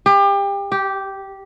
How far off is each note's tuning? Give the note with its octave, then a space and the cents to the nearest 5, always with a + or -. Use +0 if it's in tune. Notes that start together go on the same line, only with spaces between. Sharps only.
G4 +30
G4 -10